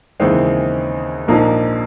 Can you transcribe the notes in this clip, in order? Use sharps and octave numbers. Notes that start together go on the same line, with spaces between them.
D#2 C#3 E3 G#3 C4
A#1 G#2 F3 A#3 D#4